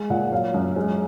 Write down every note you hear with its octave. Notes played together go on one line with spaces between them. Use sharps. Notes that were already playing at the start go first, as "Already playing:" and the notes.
Already playing: G#3
A#2 F#5
F#3 F5
F#2
G#3